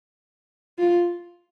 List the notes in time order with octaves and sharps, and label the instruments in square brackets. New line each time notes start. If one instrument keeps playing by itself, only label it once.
[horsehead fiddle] F4